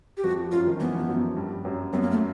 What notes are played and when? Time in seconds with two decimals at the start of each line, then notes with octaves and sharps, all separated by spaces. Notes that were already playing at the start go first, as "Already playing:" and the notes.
0.17 G4
0.24 F2 F3 F#4
0.52 F#2 F#3 F4
0.67 D#3
0.80 E3 B3
0.95 F3
1.08 F#2 F#3
1.36 G2 G3
1.65 F#2 F#3
1.93 F#2 F#3 B3
2.02 A#3
2.11 A3